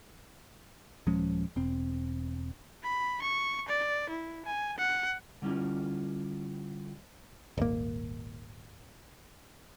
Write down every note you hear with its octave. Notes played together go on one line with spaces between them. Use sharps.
D#1 F3 G#3 C#4
E1 C4
B5
C#6
D5
E4
G#5
F#5
D3 G3 C#4 E4 F4
D#1 G#1 A#3